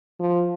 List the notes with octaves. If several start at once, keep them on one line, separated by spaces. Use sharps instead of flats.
F3